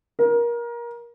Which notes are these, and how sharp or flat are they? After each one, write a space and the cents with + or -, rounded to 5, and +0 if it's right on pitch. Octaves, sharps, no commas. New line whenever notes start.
A#4 +25